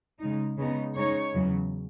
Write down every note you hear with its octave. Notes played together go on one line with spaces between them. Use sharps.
C#3 G#3 D#4
C#3 G#3 B3 D#4
C#3 G#3 D#4 C#5
E2 C#3 F#3